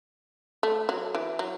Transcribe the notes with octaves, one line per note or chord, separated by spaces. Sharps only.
A3
F#3
E3
F#3